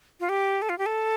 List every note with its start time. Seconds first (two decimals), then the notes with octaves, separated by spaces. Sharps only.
0.20 F4
0.29 G4
0.62 A4
0.69 F4
0.78 G4
0.86 A4